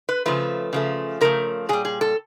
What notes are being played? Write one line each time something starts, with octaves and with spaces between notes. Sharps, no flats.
B4
C#3 F3 A3 B4
C#3 F3 A3
C#3 F3 A3 A#4
A#2 G3 G#4
G#4
A4